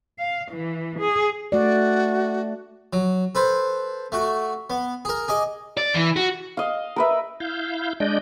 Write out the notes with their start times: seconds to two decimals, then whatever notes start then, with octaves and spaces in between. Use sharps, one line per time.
0.19 F5
0.52 E3
0.99 G#4
1.52 A3 F#4 D5
2.93 F#3
3.35 A4 B4 C5
4.12 A3 F#4
4.70 B3
5.05 G#4 A#4
5.28 G#4 D#5 D6
5.77 D5
5.94 E3
6.16 F#4
6.57 D#5 F5
6.96 A#4 B4 E5
7.40 E4 F5 G6
8.00 G#3 D4 D5 D#5 G6